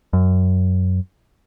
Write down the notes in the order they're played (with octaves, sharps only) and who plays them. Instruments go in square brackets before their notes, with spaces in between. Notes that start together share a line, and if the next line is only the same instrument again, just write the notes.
[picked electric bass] F#2